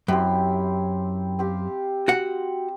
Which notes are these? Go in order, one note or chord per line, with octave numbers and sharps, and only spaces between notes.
F#2 C4 E4 G4
C4 G4 F5
F#4 F#5